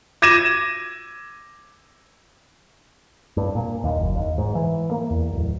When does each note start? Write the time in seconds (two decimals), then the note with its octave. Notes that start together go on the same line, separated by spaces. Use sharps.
0.22 D6 G#6 A#6 D#7 E7
3.37 G2
3.55 A#2
3.84 D#2
3.98 F#1
4.16 D#2
4.38 G#2
4.55 E3
4.91 A#3
5.10 E2
5.33 D1